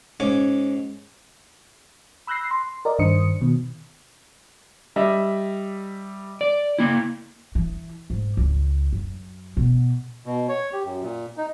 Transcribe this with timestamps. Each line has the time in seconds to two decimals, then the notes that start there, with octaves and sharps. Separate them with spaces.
0.20 G#2 C#4 G#5 D6
2.27 B5 E6 F#6 G6 A#6 C7
2.51 C6
2.85 A#4 D5 D#5
2.99 G2 D#3 D4 C5 D#6 C#7
3.41 B2 D#3
4.96 G3 D#5 E5
6.41 D5
6.79 A#3 E4
7.55 E3
8.10 G#2
8.37 C#2
8.93 F#2
9.57 B2
10.26 B2
10.49 C#5
10.73 G4
10.85 F#2
11.03 A#2
11.37 D#4